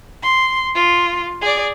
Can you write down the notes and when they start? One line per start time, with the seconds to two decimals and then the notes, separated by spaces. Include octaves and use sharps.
0.23 C6
0.75 F4
1.42 G#4 D5